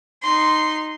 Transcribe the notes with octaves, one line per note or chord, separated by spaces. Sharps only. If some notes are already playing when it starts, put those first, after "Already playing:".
D#4 C6